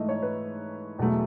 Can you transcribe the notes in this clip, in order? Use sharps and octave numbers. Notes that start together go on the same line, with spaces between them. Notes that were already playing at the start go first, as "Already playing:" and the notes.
Already playing: G#2 E3 A3 D#5
C#5
B4
E2 B2 F#3 A3